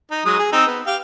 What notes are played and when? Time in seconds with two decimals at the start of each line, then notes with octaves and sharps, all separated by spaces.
0.11 D#4
0.25 F#3 G#3 D#6
0.39 G#4
0.53 C4 D#4 E6
0.67 B3
0.87 G4 F5 G5